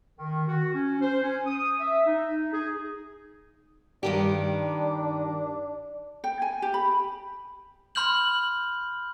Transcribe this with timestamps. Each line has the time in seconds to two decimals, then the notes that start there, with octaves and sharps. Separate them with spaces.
0.18 D#3
0.48 F#4
0.74 C#4
1.01 C5
1.22 C#4
1.47 D#6
1.81 E5
2.07 D#4
2.53 G#4
4.03 G2 D#3 D4 G4
6.24 G5
6.42 G#5
6.62 G4
6.74 B5
7.95 B5 C6 F6 G6 F#7